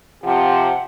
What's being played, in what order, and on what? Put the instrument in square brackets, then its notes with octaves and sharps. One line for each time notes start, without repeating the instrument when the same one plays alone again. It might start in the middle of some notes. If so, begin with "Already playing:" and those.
[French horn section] C3 F3 [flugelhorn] G4 [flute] F#5